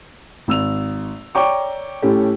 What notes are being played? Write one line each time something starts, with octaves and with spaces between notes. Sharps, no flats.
G#1 E6 F7
C#5 D5 G5 A#5 C#6 D6
A2 A3 C#4 G4 A4